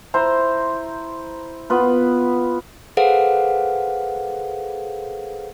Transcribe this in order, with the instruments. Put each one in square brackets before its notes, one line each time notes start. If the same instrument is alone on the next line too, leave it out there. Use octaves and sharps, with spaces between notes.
[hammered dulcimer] E4 C5 A#5
B3 F4 B4
[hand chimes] G#4 A4 B4 C5 F5 F#5